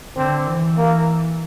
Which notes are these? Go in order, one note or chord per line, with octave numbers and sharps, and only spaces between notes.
D3 C4
E3
A#3